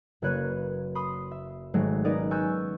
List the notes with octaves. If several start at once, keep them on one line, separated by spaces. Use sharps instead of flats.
F#1 A#3 B4 C#5 F#6 D#7
B5 C6 D#6
E5
G#1 F#3 G#3 A3
B3 C#4 D#4 A#4 D5 D#5
G#5 C#6 E6 F#6 G6 A6